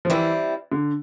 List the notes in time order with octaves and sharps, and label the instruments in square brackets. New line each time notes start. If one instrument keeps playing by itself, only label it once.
[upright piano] F3
[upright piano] E3 [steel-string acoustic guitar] G3 C4 E4
[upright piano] D3